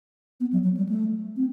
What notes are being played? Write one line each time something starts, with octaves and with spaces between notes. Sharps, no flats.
B3
F#3
F#3
G3
A3
C4